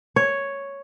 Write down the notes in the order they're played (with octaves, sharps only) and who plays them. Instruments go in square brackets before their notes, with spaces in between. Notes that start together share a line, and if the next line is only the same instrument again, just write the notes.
[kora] C#5